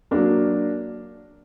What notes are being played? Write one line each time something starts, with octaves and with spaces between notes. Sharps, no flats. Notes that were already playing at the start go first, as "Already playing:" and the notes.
F#3 A#3 D4 A#4